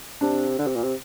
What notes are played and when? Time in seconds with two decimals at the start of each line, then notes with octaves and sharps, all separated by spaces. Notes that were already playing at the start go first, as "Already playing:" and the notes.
0.21 C3 D4
0.58 D3
0.67 C3
0.75 A#2
0.83 C3